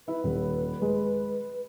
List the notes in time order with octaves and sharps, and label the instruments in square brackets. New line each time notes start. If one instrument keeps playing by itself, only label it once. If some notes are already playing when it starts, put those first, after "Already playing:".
[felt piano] E4 [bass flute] B4
[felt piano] D#1
G#3